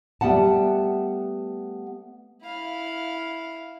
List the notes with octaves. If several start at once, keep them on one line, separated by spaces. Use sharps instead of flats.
G3 A3 B3 F#5 A5
E4 F5